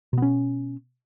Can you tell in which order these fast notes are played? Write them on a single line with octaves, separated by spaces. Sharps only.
B2 B3 C#4